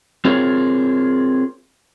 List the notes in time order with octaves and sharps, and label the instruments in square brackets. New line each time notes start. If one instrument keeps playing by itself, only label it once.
[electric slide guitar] C4 F4 G#4 A#4 C#5